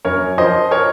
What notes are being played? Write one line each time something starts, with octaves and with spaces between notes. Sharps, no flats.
F#2 A#4 C#5
F3 C5 D#5
A#4 C#5